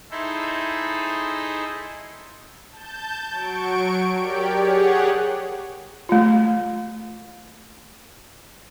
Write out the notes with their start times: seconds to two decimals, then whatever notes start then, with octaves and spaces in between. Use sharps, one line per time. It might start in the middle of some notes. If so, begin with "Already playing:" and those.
0.11 D#4 E4 G#4 A4 C5 E5
2.71 A5 G6
3.31 F#3 C#6 D7
4.16 G4 A#4 C#5 D5 G5
4.53 G4 G#4 C#5 F#5
6.09 A3 F4